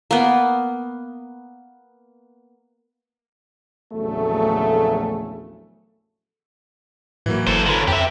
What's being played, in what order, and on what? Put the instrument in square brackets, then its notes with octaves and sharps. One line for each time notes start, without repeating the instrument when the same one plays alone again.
[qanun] A#3 B3
[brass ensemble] A#1 E2 C#3 F#3 A3
[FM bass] A2 [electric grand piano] E3 F#3 A#3
[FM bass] G1 [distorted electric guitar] A4 C5
[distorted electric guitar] D3 C#4 [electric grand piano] A4 B4 A#5
[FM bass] F2 [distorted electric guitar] G4 E5